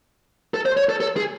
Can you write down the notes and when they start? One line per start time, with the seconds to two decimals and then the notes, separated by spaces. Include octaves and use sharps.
0.54 A4
0.66 C5
0.77 C#5
0.89 A4
1.00 A4
1.17 G#4